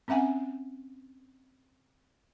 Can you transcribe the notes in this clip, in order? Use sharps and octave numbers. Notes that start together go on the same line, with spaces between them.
C4 C#4 E5 F#5 G#5